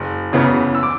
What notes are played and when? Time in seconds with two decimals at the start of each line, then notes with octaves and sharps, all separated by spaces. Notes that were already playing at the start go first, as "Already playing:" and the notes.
Already playing: F#1
0.33 E2 C#3 E3 B3
0.75 E6
0.83 D6